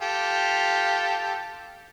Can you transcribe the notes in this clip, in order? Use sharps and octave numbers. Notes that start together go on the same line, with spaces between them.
F4 G4 A4